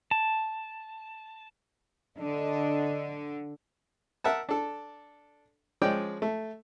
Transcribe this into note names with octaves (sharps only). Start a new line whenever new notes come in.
A5
D3 D4 D#5
A#4 E5 F#5 A5
D4 A4
F3 G#3 C#4 D5 G5
A3